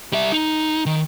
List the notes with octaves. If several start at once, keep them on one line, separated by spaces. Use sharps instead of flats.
G3 E5
D#4
D#3